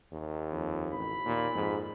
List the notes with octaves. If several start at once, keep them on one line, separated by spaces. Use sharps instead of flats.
D#2
F2
A1 B5
D#2 A#2
F2 G#2